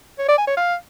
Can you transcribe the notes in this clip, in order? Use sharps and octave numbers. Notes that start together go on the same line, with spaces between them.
C#5
D5
G#5
C#5
F5